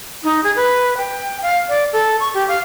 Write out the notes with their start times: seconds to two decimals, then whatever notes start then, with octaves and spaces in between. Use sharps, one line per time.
0.24 D#4
0.44 G#4
0.56 B4
0.97 G5
1.42 F5
1.69 D5
1.93 A4
2.20 C#6
2.34 G4
2.48 F5